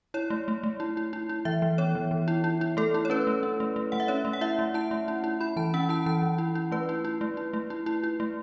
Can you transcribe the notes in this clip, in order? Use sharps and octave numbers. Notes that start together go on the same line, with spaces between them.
E4 C#5
A3
A3
A3
E4
E4
E4
E4
E3 E5
E3
B3 C#5
E3
E3
E4
E4
E4
A3 A4
E4
C#5
C#4 B4
A3
C#4
A3
A3
A3 F#5
E5
C#4 C#5
A3
F#5
E4 E5
A3
E4 A5
A3
E4
E4
E4 B5
E3 A5
C#4 F#5
E4 A5
E3 A5
E3
E4
E4
A3 B4
E4
E4
A3
E4
A3
E4
E4
E4
A3